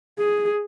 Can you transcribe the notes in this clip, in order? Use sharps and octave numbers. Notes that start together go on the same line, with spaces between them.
G#4